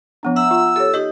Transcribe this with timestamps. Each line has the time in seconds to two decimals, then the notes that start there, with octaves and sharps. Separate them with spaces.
0.23 F3 B3 D4
0.36 E5 F#5 A#5 E6
0.51 F4
0.76 G4 A4 C#5
0.94 D#4 G4 D#5